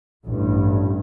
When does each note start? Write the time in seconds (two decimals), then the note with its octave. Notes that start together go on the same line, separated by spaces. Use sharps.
0.24 A1 G2